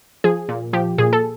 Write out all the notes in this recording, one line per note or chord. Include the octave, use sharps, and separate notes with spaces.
F3 G#4
A#2
F3 G4
A#2 G#4
A4